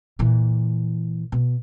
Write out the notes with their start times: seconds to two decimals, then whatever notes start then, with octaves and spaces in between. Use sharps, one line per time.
0.19 A#2 E3
1.32 B2